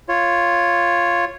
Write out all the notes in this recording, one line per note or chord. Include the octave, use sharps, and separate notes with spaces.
F4 C#5